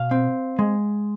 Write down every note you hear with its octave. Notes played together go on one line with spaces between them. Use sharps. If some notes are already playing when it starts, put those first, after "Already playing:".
Already playing: B2 F5
C4
G#3